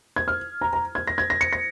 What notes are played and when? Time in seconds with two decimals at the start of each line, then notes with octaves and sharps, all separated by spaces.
0.16 G#6
0.28 F6
0.61 A#5
0.73 A#5
0.95 G#6
1.07 A#6
1.18 G#6
1.30 A#6
1.41 C#7
1.53 A#6